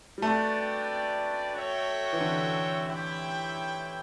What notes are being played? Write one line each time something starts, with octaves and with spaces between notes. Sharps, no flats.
G3
A3 D4 F#4 B4 D5 G5
F#4 A4 C#5 E5 G5
E3
D3
E4 G4 C#5 E5 G5